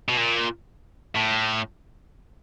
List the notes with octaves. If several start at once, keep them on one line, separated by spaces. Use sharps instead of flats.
B2
A#2
A2